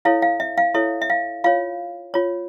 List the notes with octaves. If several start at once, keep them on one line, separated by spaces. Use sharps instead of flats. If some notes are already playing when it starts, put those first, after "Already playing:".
E4 A4 C#5 F5
F5
E5
F5
E4 A4 C#5 E5
E5
F5
F4 C#5 F5
F4 C#5